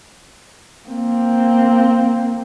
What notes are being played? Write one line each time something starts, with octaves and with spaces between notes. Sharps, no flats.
A#3 C4